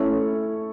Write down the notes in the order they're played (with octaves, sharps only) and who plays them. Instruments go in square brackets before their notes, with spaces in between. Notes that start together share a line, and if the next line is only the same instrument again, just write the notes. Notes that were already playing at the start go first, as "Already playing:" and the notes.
Already playing: [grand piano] A3 C#4 E4 A4 C#5